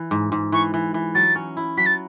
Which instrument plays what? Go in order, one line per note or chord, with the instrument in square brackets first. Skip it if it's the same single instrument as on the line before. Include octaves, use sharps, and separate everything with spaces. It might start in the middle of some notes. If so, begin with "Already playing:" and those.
Already playing: [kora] E3
G#2
G#2
[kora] E3 [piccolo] C#6
[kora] E3
E3
[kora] F#3 [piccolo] A6
[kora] C#4
E4
[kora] F#3 [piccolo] B6
[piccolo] A6